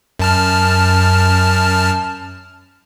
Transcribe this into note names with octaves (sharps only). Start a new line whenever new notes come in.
F#2 A5 F6